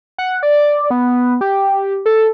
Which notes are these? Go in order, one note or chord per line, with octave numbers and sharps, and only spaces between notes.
F#5
D5
B3
G4
A4